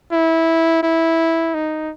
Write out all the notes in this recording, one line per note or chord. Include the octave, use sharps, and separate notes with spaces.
E4
E4
D#4